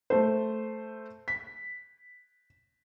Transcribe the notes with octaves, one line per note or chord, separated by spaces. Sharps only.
A3 C5
B6